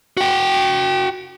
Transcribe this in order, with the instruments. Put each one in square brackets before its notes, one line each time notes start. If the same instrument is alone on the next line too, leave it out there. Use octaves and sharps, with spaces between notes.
[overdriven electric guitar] F#4 G5